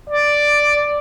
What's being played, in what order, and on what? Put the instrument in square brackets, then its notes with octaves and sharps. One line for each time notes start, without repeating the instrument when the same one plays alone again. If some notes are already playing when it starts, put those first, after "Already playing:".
[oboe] D5